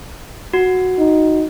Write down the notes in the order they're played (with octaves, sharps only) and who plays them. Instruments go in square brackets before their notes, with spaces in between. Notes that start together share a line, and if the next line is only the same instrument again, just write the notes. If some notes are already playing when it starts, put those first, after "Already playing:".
[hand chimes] F#4
[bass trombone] D#4